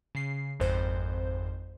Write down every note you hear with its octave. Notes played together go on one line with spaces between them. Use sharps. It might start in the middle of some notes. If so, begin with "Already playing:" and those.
C#3 C7
G#1 F2 C5